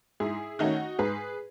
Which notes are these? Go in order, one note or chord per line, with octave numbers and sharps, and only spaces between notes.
G#2 E4 G#4
D#3 A3 C#4 D#4 F#4
G#2 G#4 B4